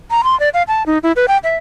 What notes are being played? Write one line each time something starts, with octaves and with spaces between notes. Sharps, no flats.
A#5
C6
D5
F5
A5
D#4
E4
B4
G5
E5